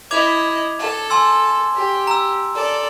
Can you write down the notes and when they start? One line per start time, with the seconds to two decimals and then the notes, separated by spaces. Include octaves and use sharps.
0.11 E4 D#5 D6 G#6 F7
0.79 A4
1.10 G#5 C6 E6
1.75 G4
2.07 A#5 E6
2.55 A4 D5